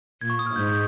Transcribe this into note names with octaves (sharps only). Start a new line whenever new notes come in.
A#2 G#6
C#6
D#6
F6
G#2 G6